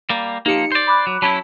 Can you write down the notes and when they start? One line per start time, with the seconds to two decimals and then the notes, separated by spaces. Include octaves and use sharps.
0.10 G3 A#3
0.46 F3 A#3 D#4 G4 C#7
0.72 C5 D5
0.87 B5 D6 F#6
1.07 F#3
1.22 F#3 C#4 E4 A5 B5 B6